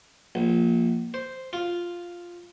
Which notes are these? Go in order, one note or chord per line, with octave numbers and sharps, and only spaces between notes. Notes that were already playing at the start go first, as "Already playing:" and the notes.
A#1
C5
F4